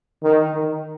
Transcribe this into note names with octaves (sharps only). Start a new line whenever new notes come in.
D#3
D#3